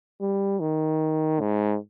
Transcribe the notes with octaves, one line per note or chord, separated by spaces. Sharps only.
G3
D#3
G#2